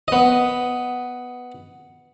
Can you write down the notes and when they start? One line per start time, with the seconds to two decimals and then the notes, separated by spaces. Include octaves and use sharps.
0.08 B3 D#5